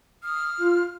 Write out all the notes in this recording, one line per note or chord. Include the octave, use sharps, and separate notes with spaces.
D#6 F6
F4